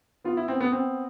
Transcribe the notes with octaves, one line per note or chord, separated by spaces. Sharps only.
B3 F4
E4
B3 C4
B3
B3 C4